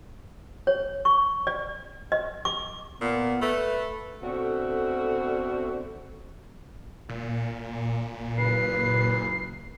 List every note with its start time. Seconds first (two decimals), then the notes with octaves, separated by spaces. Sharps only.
0.67 C#5
1.05 C#6
1.47 D5
2.12 D#5
2.45 D6
3.01 A#2 B3
3.42 A3 B4
4.22 B2 D3 A3 C4 F#4
7.09 A#2
8.38 F#1 B4 C7